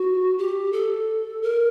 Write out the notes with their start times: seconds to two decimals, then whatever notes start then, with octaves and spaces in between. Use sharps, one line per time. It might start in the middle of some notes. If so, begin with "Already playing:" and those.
Already playing: F#4
0.38 G4
0.73 A4
1.42 A#4